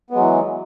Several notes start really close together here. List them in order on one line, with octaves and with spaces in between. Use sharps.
B3 G#3 F#3 E3